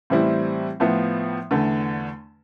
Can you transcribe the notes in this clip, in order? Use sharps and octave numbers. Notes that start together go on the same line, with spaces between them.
A2 E3 G3 C4 E4
A2 F3 B3 E4
E2 D3 A3